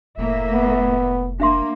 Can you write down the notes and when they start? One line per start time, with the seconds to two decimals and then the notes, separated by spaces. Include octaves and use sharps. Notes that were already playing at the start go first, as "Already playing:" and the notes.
0.17 F1 A2 A#3 E5
0.54 B3
1.40 A#3 D4 E5 C6